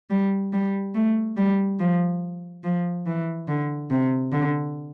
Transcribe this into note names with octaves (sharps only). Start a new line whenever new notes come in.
G3
G3
A3
G3
F3
F3
E3
D3
C3
D3